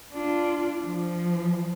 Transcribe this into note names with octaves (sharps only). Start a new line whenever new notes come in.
D4 F4
F3